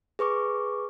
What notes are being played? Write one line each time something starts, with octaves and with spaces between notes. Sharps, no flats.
G#4 B4 C#6 D6